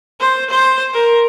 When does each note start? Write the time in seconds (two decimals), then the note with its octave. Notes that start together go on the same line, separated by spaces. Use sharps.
0.20 C5
0.50 C5
0.94 A#4